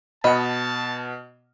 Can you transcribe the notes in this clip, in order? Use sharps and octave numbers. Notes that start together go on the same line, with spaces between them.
B2 D#5 F#5 A5 B5